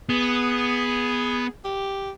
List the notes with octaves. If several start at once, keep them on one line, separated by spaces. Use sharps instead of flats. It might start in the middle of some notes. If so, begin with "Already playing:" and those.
B3 G#4
G4